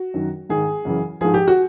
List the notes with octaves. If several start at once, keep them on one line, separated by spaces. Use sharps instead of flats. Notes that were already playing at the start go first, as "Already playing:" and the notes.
Already playing: F#4
F#2 D#3
G#2 D#3 G#4
F#2 C#3 E3
G#2 F3 G#4
G4
F#4